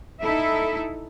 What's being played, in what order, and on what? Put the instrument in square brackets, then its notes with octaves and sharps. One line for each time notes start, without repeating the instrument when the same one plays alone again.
[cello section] D#4 E4 A4 E5